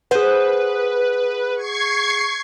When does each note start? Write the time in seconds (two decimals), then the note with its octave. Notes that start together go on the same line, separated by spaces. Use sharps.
0.11 G#4 B4 C5 F#5
1.55 C#6 G#6 C7